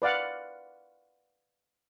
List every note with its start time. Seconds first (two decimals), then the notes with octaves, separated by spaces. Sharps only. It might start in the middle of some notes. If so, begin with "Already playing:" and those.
0.02 B4 D5 F5 F#5